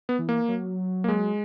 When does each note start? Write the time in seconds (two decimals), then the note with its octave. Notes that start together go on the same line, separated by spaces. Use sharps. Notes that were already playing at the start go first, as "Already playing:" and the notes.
0.09 B3
0.19 E3
0.29 A#3
0.49 F#3
1.04 A#3
1.08 G#3